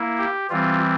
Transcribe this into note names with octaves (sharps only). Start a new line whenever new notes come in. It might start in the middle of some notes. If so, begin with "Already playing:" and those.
Already playing: A#3 E4
G4
E3 G3 C4 F4